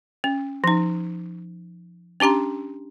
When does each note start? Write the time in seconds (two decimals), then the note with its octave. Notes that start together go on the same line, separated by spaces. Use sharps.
0.24 C#4
0.64 F3 D#4
2.20 C#4 D4 G4 A#5 C6